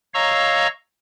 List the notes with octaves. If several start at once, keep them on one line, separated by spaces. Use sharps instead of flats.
C#5 D#5 F5 A#5 C#6 E6